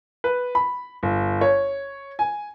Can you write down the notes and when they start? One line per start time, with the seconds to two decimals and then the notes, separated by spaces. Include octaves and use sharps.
0.24 B4
0.55 B5
1.03 G1
1.41 C#5
2.19 G#5